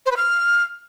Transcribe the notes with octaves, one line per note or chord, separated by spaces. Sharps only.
C5
B4
F6